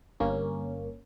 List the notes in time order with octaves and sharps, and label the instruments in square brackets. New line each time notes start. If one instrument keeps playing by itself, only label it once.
[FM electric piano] G1 G2 A#3 C#4